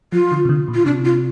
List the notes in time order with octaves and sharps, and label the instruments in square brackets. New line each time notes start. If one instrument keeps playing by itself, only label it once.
[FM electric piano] F3 [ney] F4
[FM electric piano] D3
C3
D3
A#2
[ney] F4
[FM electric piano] C3 [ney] D4
[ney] F4